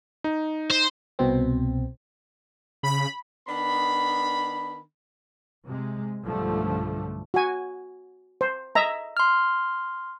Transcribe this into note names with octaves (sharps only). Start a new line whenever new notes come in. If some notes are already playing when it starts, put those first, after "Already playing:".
D#4
C5
C2 B2 C4
C#3 B5
D#3 B3 D4 B5
C3 G#3
B1 G2 D3 F3 G3 A3
F#4 G#5
C5
D#5 E5 A#5
C6 F6